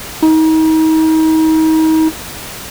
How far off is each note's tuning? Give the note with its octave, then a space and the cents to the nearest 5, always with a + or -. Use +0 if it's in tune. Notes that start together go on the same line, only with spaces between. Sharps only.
D#4 +35